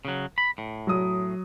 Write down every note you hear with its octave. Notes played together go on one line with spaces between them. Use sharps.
C#3 F#3
B5
A2
F#3 D#6